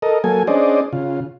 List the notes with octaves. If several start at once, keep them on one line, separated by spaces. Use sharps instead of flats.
A4 A#4 D#5
F#3 A#3 A4 G#5
C#4 D4 G#4 C5 D5 D#5
C#3 F4